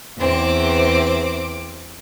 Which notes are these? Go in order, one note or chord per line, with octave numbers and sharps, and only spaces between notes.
E2 C4 D6